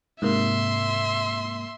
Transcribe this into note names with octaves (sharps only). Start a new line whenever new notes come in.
G#2 C3 A#3 E5 C6